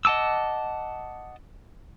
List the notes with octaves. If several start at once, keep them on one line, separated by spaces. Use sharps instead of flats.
D#5 F#5 A5 D6 E6